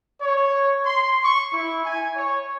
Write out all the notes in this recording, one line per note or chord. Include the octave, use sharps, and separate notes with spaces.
C#5
C6
C#6
E4
G#5
C#5